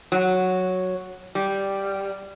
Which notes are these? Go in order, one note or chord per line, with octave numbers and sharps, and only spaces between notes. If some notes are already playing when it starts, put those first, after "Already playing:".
F#3
G3